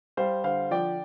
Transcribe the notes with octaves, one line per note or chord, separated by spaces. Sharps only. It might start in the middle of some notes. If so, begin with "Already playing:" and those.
G3 C5 F5
D3 C5 F5
F3 D5 G5